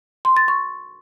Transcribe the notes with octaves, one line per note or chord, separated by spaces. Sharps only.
C6
A6
C#6